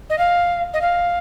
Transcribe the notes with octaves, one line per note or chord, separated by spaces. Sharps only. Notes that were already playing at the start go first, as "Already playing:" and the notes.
D#5
F5
D#5
F5